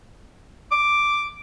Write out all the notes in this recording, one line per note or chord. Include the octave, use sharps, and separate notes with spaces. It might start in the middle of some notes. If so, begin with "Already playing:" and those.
D6